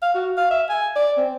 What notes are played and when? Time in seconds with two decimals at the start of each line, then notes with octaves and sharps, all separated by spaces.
0.02 F5
0.15 F#4
0.37 F5
0.50 E5
0.69 G#5
0.96 D5
1.17 C4